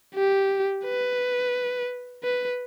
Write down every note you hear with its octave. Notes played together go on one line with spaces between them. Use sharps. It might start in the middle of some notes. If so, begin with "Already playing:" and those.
G4
B4
B4